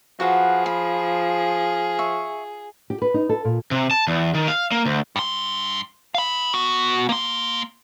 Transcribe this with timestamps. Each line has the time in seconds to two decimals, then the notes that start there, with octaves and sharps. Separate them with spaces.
0.20 F3 F#4 G#4 B4 F#5
0.66 B5
1.99 E5 C#6
2.90 G4
3.02 B4
3.14 D#4
3.29 A4
3.45 A#2
3.71 C3
3.91 A5
4.07 E2
4.35 D#3
4.48 F5
4.71 A#3
4.86 D2
5.16 G2 C6
6.14 F5 B5
6.53 B3 F#4
7.09 A#3 C6